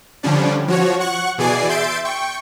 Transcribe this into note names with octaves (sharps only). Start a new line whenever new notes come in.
D3 F3 G3 C#4 D4
F3 F#4 C#5
F#5 C#6 F#6
B2 E3 G#4 D5 G#5 C7
E5 C6 G6 A6 D7
G5 C#6